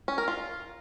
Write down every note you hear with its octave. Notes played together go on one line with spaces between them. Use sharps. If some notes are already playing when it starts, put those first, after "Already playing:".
C#4
A#4
F4